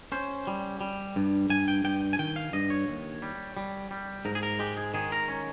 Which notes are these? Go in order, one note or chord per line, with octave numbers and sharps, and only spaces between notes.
C#4 C5
G3
G3
G2
G2 G#5
G5
G2 G5
G#5
D#3 G5
F5
G2 D#5
C#5
D#2
G3
G3
G3
G#2 A#4
G#4
A#4
G#3 G4
G#4
D#3 G#4
A#4
C#4